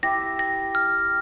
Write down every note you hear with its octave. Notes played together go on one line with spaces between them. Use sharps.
E4 G4 A#6
A#6
F6